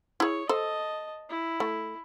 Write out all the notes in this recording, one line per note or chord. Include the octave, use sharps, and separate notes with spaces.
E4 G#4 C#5
A4 C5 D#5 A5
E4
A3